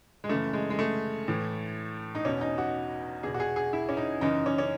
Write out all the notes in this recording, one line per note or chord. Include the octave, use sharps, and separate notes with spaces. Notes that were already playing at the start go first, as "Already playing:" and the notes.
G#3
F#2 C#3 E3 A3
G#3
G#3
A3
A2 E3
D#4
E2 B2 C#4
D#4
F#4
E2 B2 G#4
F#4
G#4
G#4
E4
C#4
D#4
F#2 C#3 E3 D#4
C#4
C#4